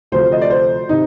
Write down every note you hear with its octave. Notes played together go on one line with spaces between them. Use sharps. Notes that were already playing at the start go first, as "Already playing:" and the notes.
D2 C3 F3 A3 C5
D#5
D5
C5
C3 D#4